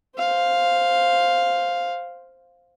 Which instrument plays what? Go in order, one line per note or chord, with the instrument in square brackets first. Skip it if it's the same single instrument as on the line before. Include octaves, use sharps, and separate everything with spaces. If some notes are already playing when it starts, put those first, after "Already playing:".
[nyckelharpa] C5 F5